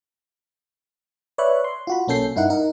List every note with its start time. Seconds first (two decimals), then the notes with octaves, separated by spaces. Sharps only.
1.38 B4 C#5 D5 E5 F#6
1.64 C6
1.87 F4 F#4 B5
2.08 B1 A#3 C#4 A4 G6 C7
2.36 G2 D#4 E4 A#4 F#5
2.50 D#4 A#4